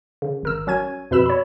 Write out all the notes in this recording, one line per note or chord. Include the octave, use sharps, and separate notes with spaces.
C#3
G#1 A#4 E6
F#3 C#4 G#6 D#7
F2 B2 B4 B5 E6 E7
C#5 B5